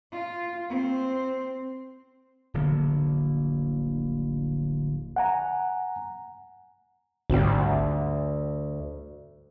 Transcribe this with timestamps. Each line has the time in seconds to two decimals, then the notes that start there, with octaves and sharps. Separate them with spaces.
0.12 F4
0.69 C4
2.54 D1 A#1 D3 A#3
5.16 F#5 G#5 A#5
7.30 G#1 D2 G3